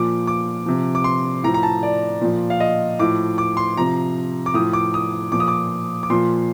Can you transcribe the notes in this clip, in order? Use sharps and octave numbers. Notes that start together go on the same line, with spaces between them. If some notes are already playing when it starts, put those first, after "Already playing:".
Already playing: A#2 F3 D6
D6
C3 F3
D6
C6
A2 F3 A#5
A#5
A5
D5
A#2 F3
F5
D#5
A2 F3 D6
D6
C6
C3 F3 A#5
D6
A2 F3 D#6
D6
D#6
A#2 F3 D6
D#6
D6
D6
A#2 F3 C6